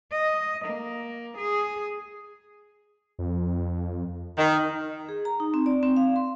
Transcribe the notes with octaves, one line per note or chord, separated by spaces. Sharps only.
D#5
A#3
G#4
F2
D#3
G#4
A#5
D#4
C4
D5
C4
F5
C6